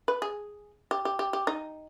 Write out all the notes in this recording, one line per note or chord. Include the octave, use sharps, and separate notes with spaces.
B4
G#4
G4
G4
G4
G4
D#4